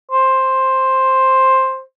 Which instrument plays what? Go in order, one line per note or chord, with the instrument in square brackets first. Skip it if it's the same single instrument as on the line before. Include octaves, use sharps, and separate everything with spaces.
[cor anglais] C5